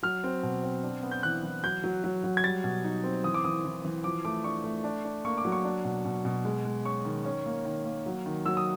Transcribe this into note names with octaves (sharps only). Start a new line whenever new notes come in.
F#3 F6
C4
B2
C4
D4
B3
G6
E3 F#6
E3
F#3 G6
F#3
F#3
F#3
G#6
G3 A6
B2
D#4
C4
E3 D#6
D6
E3 D#6
E3
E3
F3 D6
A3 D6
D4 C#6
A3
D4
D4
A#3 C#6
D6
F#3
C#6
D4
B2
B2
B2
G#3
G#3
C#4 C#6
D#3
C#4
A#3
D#3
A#3
F#3
D#3
F#3 E6
D#6